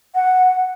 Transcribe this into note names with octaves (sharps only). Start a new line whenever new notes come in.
F#5